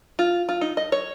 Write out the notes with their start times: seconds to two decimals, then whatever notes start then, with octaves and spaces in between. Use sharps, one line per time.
0.19 F4
0.49 F4
0.61 D#4
0.77 D#5
0.92 C#5